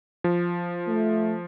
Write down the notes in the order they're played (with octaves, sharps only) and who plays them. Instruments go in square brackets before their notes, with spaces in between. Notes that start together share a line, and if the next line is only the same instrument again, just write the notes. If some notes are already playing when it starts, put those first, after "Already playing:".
[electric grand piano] F3
[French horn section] A3